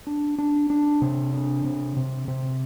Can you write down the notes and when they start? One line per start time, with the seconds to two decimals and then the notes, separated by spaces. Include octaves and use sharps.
0.07 D4
0.38 D4
0.70 D4
1.02 C3
1.33 D4
1.65 C3
1.96 C3
2.28 C3